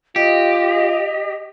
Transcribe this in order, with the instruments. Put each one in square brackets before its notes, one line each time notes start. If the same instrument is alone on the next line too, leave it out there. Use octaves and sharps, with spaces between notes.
[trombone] F4 [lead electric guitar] G4 [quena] D#5